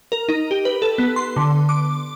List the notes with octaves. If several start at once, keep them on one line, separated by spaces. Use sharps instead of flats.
A#4
D#4
G4
B4
A4
B3
C6
D3
D6